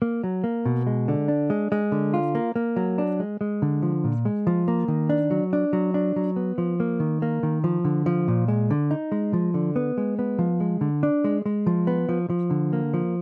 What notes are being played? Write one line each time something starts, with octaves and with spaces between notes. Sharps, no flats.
A#3
F#3
A#3
B2
G#3
D3
D4
G#3
G#3
D3
F4
A#3
A#3
F#3
D4
G#3
G#3
D3
F3
A#2
G#3
F3
A#3
D#3
D4
F#3
D4
F#3
D4
F#3
B3
F3
A#3
D#3
A#3
D#3
F3
D3
F3
A#2
G#3
D3
D#4
G#3
F3
D3
B3
G#3
B3
F3
G#3
D3
D4
G#3
G#3
F3
B3
F3
F3
D3
A#3
F3